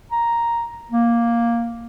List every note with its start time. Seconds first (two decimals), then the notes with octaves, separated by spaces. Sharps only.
0.12 A#5
0.91 A#3